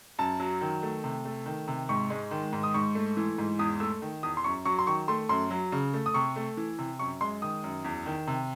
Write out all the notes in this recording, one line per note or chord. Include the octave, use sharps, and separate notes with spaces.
F#2 A5
F#3
D#3
A3
C3
A3
D#3
C3
G#2 C#6
G#3
D#3
G#2
D#6
G#2 C#6
A3
E3
G#2
E2 D#6
A3 E6
D#3
E2 D#6
C6
F#2 C#6
F#3 C#6
C6
D#3 C#6
A3 C6
F#2 C6
F#3
C#3
A3
D#6
C3 C#6
A3
E3
C3
F#2 C#6
G#3 C6
D#3 D#6
F#2
E2
D#3
C3